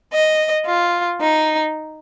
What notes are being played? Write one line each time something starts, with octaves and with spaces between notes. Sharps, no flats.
D#5
F4
D#4